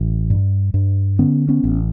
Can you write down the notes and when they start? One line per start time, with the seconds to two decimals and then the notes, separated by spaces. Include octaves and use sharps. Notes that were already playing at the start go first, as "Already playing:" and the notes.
Already playing: A1
0.30 G2
0.74 G2
1.19 D3 B3 C#4
1.49 B3 C#4
1.64 A1